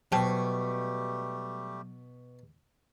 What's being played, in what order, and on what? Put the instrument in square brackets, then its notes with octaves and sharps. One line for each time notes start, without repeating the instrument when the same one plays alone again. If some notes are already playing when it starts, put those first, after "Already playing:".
[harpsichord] B2 [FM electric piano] F#3 [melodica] G3 A3 G4 [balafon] C5 G5 A5